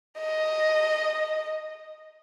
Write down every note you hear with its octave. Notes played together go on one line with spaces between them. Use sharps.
D#5